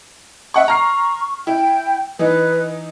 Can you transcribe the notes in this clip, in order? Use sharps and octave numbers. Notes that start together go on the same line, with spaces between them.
E5 F#5 C#6
A#5 C#6 F6 C7
E4 G5
E3 D#4 B4